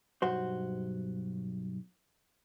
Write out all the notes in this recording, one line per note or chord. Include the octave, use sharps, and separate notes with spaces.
B1 G2 F#4 C5